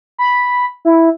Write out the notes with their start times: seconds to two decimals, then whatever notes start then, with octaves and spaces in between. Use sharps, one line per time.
0.18 B5
0.85 E4